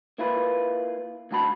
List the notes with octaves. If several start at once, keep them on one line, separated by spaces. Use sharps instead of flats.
A#3 E4 F4 B4
D2 G2 F#4 A5 B5